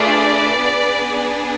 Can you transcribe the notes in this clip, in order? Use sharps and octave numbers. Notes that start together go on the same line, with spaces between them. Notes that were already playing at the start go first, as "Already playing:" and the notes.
Already playing: A3 D4 F4 G#4 B4 D5
B3 D4 G#4